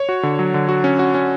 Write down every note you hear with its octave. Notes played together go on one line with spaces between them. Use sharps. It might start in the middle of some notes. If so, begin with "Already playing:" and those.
Already playing: C#5
F#4
D3
F#3
D3
F#4
C#4
F#4
C#4